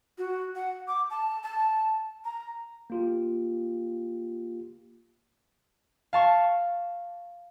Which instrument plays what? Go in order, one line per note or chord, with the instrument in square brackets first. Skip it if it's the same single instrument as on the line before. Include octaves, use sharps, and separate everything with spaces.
[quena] F#4
F#5
D6
A5
A5
A#5
[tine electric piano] A#3 F4 G4
[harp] F5 A5 C#6